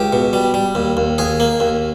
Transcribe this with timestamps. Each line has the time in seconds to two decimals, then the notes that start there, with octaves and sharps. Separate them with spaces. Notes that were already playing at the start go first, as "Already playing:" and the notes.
Already playing: C#2 G4
0.13 B2
0.33 G3
0.54 G3
0.75 D#2
0.97 D#2
1.18 D#2 G#4
1.40 A#3
1.60 D#2